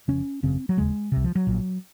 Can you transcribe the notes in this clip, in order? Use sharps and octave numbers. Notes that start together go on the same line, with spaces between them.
F1 F2 C#3 C#4
G#1 F#2 C#3 C4
F#3
F1 D#2 C#3 G#3
C2 C3
F3
F#3
A#1 A#2